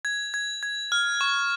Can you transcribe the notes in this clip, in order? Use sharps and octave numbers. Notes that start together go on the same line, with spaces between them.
G#6
G#6
G#6
F6
C#6